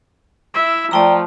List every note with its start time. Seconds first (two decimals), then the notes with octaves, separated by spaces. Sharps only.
0.54 E4 E5
0.91 F3 A3 D5 G5 A#5